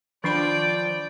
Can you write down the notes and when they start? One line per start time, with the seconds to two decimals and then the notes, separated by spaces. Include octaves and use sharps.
0.24 D#3 F3 D4 D5 G5 B5